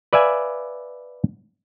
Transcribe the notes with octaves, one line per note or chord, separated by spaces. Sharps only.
B4 D5 E5 F5 G#5